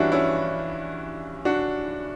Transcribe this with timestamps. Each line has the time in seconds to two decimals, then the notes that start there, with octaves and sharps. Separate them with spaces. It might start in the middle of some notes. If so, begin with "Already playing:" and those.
Already playing: G2 E3 G3 C#4 D4 E4 F#4
0.12 C#4 E4
1.45 D4 F#4